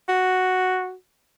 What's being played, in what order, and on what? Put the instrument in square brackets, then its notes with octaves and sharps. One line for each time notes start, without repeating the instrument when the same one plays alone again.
[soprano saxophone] F#4